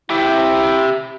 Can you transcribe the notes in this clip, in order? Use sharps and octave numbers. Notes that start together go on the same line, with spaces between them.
E4 G4 E5 G5